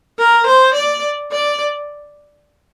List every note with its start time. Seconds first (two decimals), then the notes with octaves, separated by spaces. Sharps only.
0.18 A#4
0.46 C5
0.74 D5
1.32 D5